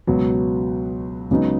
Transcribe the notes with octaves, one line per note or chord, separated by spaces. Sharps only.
C#2 B2 F#3 B3
C#2 C#3 F#3 B3 D#4